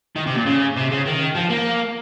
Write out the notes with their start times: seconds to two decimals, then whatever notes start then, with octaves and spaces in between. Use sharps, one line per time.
0.16 D#3
0.27 C3
0.36 A#2
0.46 C#3
0.76 C3
0.90 C#3
1.06 D#3
1.35 F3
1.49 A#3